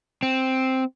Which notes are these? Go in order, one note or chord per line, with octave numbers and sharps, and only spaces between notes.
C4